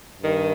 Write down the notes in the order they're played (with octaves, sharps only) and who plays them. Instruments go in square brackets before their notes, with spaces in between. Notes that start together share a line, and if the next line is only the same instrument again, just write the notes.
[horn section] G2 D#3